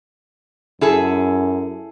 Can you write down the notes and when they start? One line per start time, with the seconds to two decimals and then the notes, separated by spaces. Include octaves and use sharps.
0.81 F#2 E4 G#4 A4